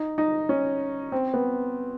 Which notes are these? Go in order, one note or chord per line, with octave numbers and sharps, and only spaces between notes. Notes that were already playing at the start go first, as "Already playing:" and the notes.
Already playing: D#4
D#4
C#4
C4
B3